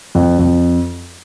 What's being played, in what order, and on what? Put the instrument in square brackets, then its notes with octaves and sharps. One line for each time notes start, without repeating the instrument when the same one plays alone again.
[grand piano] F2
F2